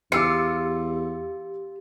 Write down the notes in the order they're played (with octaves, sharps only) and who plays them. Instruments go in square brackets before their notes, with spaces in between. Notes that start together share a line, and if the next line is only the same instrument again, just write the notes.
[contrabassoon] E2 [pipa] F4 [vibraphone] G4 [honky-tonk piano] D6 E6 C#7